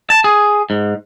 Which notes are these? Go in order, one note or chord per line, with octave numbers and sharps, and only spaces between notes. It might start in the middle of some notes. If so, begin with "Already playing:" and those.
A5
G#4
G#2